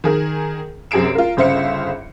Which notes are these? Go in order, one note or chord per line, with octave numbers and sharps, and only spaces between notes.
D#3 G#4 A#4
F#2 C3 G#4 C7 D7 E7
F4 A#4
G1 C#3 C5 E5 F5 C#7